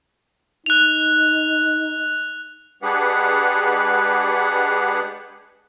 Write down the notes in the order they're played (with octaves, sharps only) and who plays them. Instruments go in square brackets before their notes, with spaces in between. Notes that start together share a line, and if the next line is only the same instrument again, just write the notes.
[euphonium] D#4 [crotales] F#6 F7
[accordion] G#3 D4 G4 G#4 B4 F#5